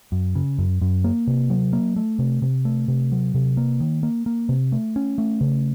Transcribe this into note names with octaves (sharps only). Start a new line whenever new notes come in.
F#2
C#3
F#2
F#2
A#3
C3
F#3
A#3
A3
C3
C3
A3
C3
F#3
C3
A#3
D#3
A#3
A#3
C3
A3
C#4
A3
C#3